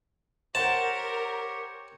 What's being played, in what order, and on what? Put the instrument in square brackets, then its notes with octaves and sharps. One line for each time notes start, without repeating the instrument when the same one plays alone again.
[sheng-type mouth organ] G4 C#5 [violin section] A#4 [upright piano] C5 F#5 [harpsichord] A5